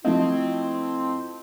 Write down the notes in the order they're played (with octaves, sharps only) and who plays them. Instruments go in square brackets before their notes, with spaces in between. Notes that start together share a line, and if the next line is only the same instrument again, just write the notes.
[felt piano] F3 A3 D#5 [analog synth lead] C4 [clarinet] E4